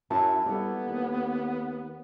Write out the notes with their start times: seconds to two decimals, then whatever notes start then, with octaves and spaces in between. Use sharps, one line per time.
0.10 F#2 F#3 E4 A5
0.46 G3 A#3 B3 E4 A4
0.87 D#2